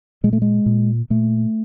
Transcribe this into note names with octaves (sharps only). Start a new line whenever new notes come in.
A#2 G#3
A3
G#3
A#2
A#2 A3